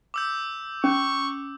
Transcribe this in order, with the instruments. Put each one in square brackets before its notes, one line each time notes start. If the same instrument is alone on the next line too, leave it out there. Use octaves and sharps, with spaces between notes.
[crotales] D6 E6 G6
[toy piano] C#4 [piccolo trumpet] C#6